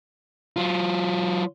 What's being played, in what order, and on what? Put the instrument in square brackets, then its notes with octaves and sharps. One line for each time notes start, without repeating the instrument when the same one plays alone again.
[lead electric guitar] F#3 F4